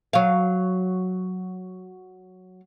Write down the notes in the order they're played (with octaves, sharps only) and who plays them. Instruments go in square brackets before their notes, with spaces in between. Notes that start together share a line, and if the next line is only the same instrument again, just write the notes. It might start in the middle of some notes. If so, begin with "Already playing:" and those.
[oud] F#3 F5